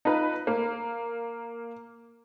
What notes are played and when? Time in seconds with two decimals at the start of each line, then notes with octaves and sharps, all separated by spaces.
0.05 D#4 F4 B4
0.47 A#3